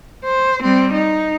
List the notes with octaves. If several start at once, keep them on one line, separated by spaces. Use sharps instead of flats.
C5
G3 C4
D#4